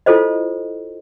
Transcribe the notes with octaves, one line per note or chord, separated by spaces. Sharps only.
E4 F4 A4 C5 D#5